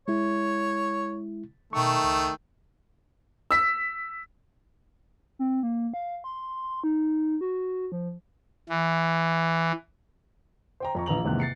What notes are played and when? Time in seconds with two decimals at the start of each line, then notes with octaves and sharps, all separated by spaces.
0.08 G#3 E4 C#5
1.73 B2 D#3 A3 C#6
2.04 C#2
3.51 E6 B6
5.39 C4
5.63 A#3
5.94 F5
6.24 C6
6.84 D#4
7.41 F#4
7.92 F3
8.69 E3
10.80 C5 G5 A#5
10.95 F2 A#5 C#6
11.06 A#1 E3 F3 A#5 F7 F#7
11.24 E2 G#2 C3 D#3 A#3 F#6
11.40 A6 C7 C#7